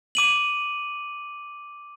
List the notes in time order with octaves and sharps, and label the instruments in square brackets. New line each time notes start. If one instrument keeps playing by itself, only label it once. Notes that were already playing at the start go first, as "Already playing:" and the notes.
[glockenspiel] D6 D#7 F#7